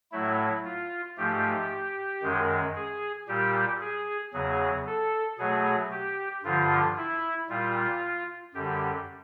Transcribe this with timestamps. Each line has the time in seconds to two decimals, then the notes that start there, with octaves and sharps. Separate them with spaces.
0.12 A2 F#3 A3 E4
0.65 F4
1.17 G#2 F3 A3 G4
2.23 F#2 D#3 G#3
2.75 G#4
3.28 A#2 G3 G4
3.81 G#4
4.34 E2 C#3 F#3 G#4
4.86 A4
5.39 B2 F#3 A3 G#4
5.91 G4
6.44 G2 D3 F3 F4
6.97 E4
7.50 A#2 G3 F4
8.54 F#2 D3 G3 G4